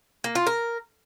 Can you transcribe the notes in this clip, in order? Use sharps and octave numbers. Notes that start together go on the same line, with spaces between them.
A#3
F4
A#4